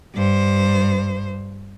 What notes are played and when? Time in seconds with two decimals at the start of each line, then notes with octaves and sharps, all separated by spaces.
0.14 G2 C5